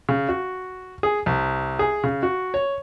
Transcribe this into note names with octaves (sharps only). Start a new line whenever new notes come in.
C#3
F#4
G#4
C2
G#4
C#3
F#4
C#5